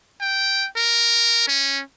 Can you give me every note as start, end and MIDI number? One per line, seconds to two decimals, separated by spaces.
0.21 0.67 79
0.76 1.44 70
1.48 1.82 61